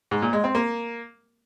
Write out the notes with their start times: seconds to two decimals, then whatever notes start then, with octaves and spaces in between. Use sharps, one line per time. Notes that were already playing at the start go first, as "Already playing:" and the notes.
0.11 G#2
0.22 A#2
0.33 G#3
0.44 C4
0.55 A#3